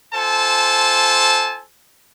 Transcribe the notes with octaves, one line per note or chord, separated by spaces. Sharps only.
F4 A4 C5 G#5 A5